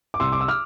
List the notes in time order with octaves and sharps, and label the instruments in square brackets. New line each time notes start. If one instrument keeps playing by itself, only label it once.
[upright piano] D6
C2 C6 E6
D6
E6
D6 F6